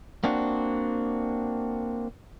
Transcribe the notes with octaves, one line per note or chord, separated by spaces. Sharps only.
A#3 C4 D4 F#4